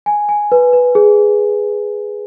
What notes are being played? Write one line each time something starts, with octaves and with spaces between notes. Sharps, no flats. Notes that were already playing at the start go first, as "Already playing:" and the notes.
G#5
G#5
B4
B4
G#4